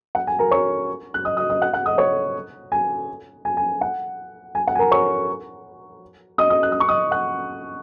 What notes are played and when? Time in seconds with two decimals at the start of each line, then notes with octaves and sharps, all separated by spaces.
0.15 F#5
0.27 G#5
0.39 A#4 A#5
0.51 C#5 C#6
1.14 F#6
1.25 D#5 D#6
1.37 D#5 D#6
1.50 D#5 D#6
1.62 F#5 F#6
1.73 F#5 F#6
1.86 D#5 D#6
1.98 C#5 C#6
2.72 G#5
3.45 G#5
3.57 G#5
3.81 F#5
4.55 G#5
4.67 F#5
4.75 G#5
4.79 A#4 A#5
4.91 C#5 C#6
6.38 D#5 D#6
6.50 D#5 D#6
6.63 F#6
6.72 D#6
6.80 C#6
6.88 D#5 D#6
7.11 F#5 F#6